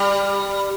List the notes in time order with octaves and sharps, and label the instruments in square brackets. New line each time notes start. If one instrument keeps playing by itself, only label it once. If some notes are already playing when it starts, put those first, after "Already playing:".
Already playing: [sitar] G3